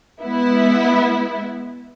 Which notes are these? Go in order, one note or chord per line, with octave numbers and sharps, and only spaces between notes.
G#3 B3 E4